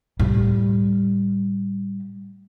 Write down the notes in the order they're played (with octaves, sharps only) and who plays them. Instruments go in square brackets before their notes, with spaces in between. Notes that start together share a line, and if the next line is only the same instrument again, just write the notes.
[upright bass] A2 G3